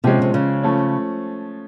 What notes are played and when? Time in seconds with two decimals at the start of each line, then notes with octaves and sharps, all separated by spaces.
0.04 C3 F3 G#3 C#4
0.22 C3
0.34 C#3
0.63 F3 A3 C#4